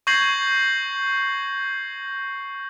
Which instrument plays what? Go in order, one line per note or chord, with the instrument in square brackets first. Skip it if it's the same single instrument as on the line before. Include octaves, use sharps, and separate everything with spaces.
[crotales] C#6 G6 G#6 A#6 C7 F#7